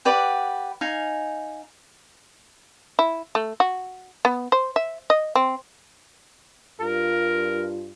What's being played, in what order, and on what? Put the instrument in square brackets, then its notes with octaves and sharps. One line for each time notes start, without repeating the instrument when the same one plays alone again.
[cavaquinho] G4 B4 D5 F#5
D#4 F5 G#5
[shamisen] E4
A3
F#4
B3
C5
E5
D#5
C4
[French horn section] G2 F4 [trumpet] A#4